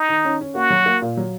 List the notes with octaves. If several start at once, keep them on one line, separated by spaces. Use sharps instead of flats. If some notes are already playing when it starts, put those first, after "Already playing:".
Already playing: D#4
D#3
C#4
C#4
A#3 F#4
F#3
A#3
A#2
F#3